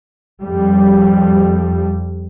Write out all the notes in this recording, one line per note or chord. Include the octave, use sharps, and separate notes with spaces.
F2 G3